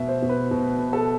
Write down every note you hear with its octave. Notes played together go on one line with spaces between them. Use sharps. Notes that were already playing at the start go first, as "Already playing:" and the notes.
Already playing: B2 B3 E5
C5
B2
B4
B2
B3
A4